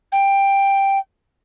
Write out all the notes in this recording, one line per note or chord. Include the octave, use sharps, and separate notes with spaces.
G5